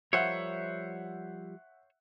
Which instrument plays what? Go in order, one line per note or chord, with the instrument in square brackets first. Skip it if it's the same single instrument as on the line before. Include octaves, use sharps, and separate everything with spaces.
[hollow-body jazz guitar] F3 G3 A#4 [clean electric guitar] C5 C#5 [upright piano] E5 F#5